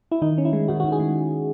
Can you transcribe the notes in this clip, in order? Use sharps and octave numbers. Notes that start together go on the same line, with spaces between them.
E4
D#3 D#4
C#4
E4
G#3
D#3 F#4
F#4
D#3
G#4
G#3